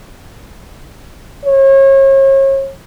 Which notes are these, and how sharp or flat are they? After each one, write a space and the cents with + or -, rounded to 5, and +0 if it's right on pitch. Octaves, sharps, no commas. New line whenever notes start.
C#5 -35